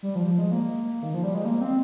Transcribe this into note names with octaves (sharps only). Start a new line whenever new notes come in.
G3
F3
F3
G#3
A#3
D#3
F3
G3
G#3
A#3
C4